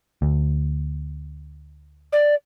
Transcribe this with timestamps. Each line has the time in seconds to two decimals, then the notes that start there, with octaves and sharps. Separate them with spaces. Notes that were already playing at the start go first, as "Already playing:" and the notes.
0.22 D2
2.13 D5